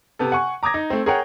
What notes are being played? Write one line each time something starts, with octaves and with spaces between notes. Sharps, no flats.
C3 B3 A4
F#5 G#5 C#6
A#5 D6 D#6 G#6 A#6
D#4
A3 C4
G#4 A#4 C#5 F#5 G5